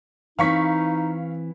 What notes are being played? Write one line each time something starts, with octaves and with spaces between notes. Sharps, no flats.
E3 C4 D#4 F5 C#6 B6